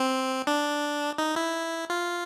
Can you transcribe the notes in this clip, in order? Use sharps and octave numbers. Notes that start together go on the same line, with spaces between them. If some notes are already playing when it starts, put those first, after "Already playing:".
Already playing: C4
D4
D#4
E4
F4